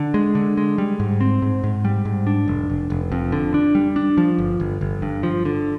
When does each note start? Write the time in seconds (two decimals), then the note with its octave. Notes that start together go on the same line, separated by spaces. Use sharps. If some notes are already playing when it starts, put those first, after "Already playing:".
Already playing: D3
0.14 G#3
0.35 D3
0.57 G#3
0.78 G3
1.00 G#2
1.21 C4
1.42 G#2
1.64 G#2
1.85 G3
2.05 G#2
2.27 D4
2.48 F1
2.70 F1
2.90 F1
3.12 F2
3.32 D3
3.54 D4
3.75 G3
3.96 D4
4.18 F3
4.38 G1
4.60 G1
4.81 G1
5.02 G2
5.23 F3
5.45 D3